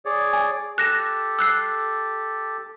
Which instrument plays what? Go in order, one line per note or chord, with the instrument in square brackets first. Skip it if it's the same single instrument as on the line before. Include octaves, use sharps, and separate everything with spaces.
[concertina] G#4 C#5 D5
[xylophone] G#5
[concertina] G4 A4 [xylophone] F#6 A#6 E7
[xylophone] E6 F#6 C7